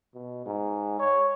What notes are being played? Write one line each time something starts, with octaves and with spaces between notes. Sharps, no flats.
B2
G#2
C#5